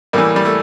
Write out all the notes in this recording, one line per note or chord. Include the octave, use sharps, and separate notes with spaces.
A2 E3 G3 A#3
G3
A3